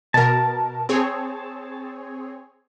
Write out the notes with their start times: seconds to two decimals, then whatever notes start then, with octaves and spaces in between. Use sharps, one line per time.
0.14 B2 A#4 A5
0.89 C4 G#4 C#5